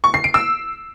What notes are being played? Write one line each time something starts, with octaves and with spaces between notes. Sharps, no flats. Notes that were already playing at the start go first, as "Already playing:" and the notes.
C#6
C7
D7
E6